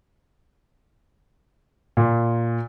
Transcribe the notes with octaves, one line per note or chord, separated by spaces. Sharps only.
A#2